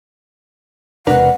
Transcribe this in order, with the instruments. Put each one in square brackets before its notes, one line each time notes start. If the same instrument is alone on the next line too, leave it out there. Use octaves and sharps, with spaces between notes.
[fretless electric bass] E1 C3 [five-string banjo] D4 A#4 B4 [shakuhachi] F#5